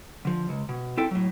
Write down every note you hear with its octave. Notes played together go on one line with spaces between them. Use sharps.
D3 F3
C#2
B2
C4 E4 A4 G5
A2 F#3